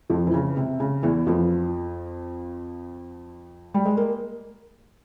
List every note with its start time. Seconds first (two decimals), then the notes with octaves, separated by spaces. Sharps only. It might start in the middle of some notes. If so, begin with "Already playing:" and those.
0.10 F2 F3
0.27 E3
0.34 C#3
0.57 C3
0.80 C#3
1.03 E2 E3
1.27 F2 F3
3.74 G3
3.85 G#3
3.97 A#3